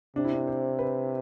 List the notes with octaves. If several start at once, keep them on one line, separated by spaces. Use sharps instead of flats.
C3 D4
E4
D4
C5
B4